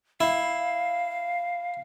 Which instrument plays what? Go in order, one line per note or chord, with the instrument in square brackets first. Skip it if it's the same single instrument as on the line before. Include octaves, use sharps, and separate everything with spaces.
[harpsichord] E4 [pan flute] F5